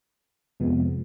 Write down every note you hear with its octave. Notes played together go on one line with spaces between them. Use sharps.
F2 C3 F3 G#3 B3